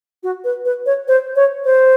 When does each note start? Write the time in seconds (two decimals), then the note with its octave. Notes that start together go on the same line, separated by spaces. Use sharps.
0.23 F#4
0.44 B4
0.65 B4
0.86 C#5
1.08 C5
1.36 C#5
1.65 C5